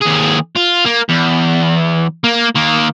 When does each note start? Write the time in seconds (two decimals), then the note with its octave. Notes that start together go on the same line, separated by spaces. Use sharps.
0.02 D#2 G#4
0.56 F4
0.85 A#3
1.09 E2
2.24 A#3
2.55 D#3 A#3